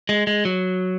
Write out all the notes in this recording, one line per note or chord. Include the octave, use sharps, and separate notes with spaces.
G#3
G#3
F#3